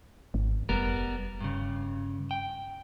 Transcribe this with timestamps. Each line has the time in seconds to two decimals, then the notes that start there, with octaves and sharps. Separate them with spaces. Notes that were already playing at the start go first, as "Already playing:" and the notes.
0.34 G#1
0.69 F1 G3 B3 A#4
1.41 G2 C#3
2.31 G5